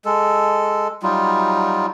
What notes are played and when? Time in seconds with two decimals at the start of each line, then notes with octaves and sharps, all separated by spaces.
0.05 G#3 A4
1.03 F#3 G3 D#4 F4